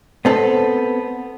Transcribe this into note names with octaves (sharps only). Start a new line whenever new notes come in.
B3 C4 A4